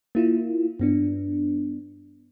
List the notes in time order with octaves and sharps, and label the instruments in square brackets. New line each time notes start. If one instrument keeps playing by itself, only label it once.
[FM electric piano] A#3 E4 F4
G2 B3 D4